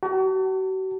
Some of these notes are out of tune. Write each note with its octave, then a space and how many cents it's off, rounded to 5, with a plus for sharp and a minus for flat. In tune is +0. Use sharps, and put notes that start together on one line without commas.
F#4 +40 A5 +35